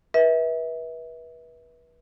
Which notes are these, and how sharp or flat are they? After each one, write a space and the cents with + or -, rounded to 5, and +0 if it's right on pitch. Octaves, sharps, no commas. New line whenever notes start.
B4 -30 E5 -30